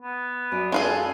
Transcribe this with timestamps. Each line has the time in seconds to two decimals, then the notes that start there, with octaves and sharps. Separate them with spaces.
0.02 B3
0.52 F#2 D5
0.72 G#3 C#4 F4 G#4 A4